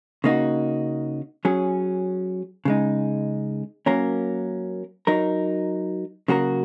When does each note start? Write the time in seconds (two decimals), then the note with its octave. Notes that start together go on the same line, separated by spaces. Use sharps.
0.24 C#3 A#3 D#4 F#4
1.45 F#3 C#4 G#4
2.65 C#3 G#3 D#4
3.86 F#3 A#3 C#4 A#4
5.07 F#3 D#4 A#4
6.28 C#3 F#3 A#3 F#4 A#4